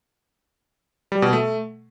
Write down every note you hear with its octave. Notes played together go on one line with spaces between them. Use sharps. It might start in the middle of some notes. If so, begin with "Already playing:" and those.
G3
B2
A3